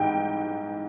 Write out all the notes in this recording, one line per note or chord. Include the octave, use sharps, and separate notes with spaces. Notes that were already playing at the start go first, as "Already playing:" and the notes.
Already playing: G#2 E3 G3 G5